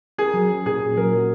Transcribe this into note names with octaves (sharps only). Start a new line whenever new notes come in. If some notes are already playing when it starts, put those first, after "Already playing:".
G#4 A#4
F#3
C#4
A#2 G#4
A#2
F#3 A#4
F#4